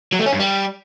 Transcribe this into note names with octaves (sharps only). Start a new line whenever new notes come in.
F#3
A3
C#4
G2
G3